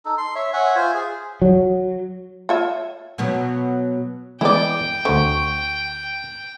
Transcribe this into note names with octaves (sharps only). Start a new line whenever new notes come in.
D#4 A4
C6
C#5 E5
C#5 E5 F#5 G#5
F4 C5 G#5
G#4
F#3
F4 C#5 E5
B2 F#3 B3
E3 G#3 B3 E4 D5 G5
D2 D3 C5 C#6